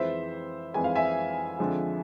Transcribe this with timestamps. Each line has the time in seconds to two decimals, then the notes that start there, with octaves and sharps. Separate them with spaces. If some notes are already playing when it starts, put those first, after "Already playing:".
Already playing: F2 E3 G#3 C5 E5
0.74 F2 E3 G#3 G#5
0.84 F5
0.95 E5 G#5
1.59 F2 D3 F3 G#3